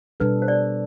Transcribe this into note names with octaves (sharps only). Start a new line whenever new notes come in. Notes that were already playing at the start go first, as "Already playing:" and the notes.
B2 G3 D4 A4 B4
C5
D5